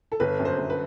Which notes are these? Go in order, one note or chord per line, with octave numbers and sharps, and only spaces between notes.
A4
G1 B4
F#2
C5
G1
B4